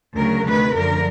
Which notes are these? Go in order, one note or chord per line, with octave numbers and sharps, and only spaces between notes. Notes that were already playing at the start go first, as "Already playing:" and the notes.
D2 C#3 F#3 A#4
D2 C3 D#3 B4
F#2 D3 F3 A#4